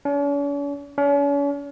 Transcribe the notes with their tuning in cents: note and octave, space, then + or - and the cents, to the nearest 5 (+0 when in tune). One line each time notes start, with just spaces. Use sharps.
C#4 +45
C#4 +40